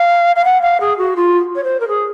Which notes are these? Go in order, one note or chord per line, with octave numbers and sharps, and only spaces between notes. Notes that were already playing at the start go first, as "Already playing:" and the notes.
Already playing: F5
F5
F#5
F5
G#4
F#4
F4
C#5
C5
A#4
G#4